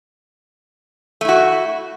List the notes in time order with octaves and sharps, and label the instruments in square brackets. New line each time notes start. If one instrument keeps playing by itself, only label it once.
[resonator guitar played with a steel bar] A3
E4
F#4